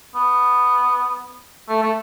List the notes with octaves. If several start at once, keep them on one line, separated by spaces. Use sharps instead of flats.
B3
A3
A3